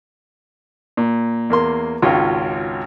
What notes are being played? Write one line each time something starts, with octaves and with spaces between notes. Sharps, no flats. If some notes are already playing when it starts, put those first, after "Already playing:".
A#2
E2 A#3 C6
G#1 C#2 C#4 F4 F#4